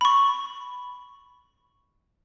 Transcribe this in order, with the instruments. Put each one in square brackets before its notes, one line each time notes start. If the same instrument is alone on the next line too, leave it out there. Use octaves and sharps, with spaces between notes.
[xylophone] B5 C#6